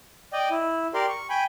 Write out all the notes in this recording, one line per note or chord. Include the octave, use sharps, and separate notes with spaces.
D5 D#5 G5
E4
G4 A#4 D5 C6
C#6
G5 G#5 B5